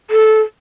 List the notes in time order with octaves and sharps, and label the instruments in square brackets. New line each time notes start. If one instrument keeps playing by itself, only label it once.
[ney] A4